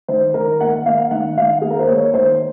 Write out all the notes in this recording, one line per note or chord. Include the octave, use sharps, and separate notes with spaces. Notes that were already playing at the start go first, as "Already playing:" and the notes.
D#3 C5
D#3 A#4
A#3 F#5
F#5
A#3 F5
D#3 F#5
D#3 F5
A#3 G#4
A#4
C5
A#3 C#5
D#3 C5